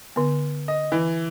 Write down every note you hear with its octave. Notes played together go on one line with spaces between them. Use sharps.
D3 B3
D#5
E3